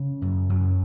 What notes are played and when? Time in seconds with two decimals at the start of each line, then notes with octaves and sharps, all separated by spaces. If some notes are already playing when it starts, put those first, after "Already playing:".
Already playing: C#3
0.22 F#2
0.49 F#2 F#3